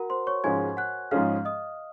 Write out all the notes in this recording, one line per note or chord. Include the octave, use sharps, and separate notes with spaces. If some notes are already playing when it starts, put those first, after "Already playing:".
Already playing: F#4 A#4 F#5 A#5
C5 C6
C#5 C#6
G#2 F3 G#3 C#4 G#5 G#6
F#5 F#6
G#2 F3 G#3 C#4 G#4 F5 F6
D#5 D#6